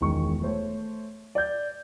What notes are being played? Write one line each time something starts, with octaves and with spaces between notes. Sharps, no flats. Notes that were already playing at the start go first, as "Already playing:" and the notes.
E1 C#2 D#3 G#3 C#6
A3 C5 C#5
D5 G6